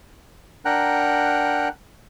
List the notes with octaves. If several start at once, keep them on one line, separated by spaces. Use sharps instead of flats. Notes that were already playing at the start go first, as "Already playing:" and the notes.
D4 A#4 F#5 G5 A#5 F#6